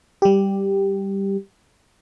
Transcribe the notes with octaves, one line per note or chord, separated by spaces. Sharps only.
G3 G4